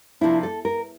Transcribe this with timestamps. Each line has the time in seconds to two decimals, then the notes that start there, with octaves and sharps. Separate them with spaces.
0.21 C3 F3 A#3 D4 E4
0.43 A4
0.65 A#4